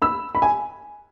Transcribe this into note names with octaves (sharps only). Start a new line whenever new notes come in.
B5 E6
B5
G#5